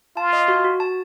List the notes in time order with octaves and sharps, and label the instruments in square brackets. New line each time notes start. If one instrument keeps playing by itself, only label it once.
[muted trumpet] F4 [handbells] A5
[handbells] D#5
F#4
F#4
A5